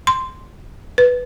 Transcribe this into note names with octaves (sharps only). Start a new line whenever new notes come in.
C6
B4